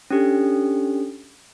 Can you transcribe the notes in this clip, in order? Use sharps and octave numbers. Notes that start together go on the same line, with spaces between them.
C#4 D4 G4 A4